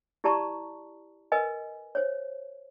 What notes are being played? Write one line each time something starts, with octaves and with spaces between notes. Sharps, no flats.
E4 G4 D5 A5 A#5 C#6
A#4 B4 D#5 G#5
C5 C#5